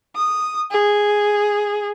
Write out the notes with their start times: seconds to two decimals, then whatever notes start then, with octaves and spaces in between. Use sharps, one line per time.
0.16 D#6
0.71 G#4